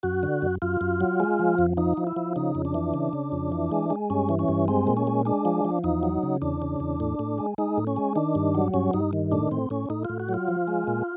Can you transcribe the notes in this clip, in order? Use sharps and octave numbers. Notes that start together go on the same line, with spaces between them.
F#2 F#4
D3
F#2
F#2 F4
F#2
F#3
G#3
F3
F2
F3 D#4
F3
E4
F3
C#3 D#4
F2
D4
E3
C#3
C#3
F2
E3
G#3
G#3
G2 C#4
E3
C#4
G2
G#3 C4
A#2
C#4
G#3
G#3 D4
F3
F3
E2 D#4
F#3
C#3
E2 D4
C#3
E2
A2
A2
G#3
G#3 D#4
A2
C#4
G#3
D#3 D4
G2
F#3
G2 C#4
G2 D#4
D#3
A2 D4
A2 C4
A2 C#4
A2 D#4
A2 F4
F#4
F#3
F4
F3
G#3
A#2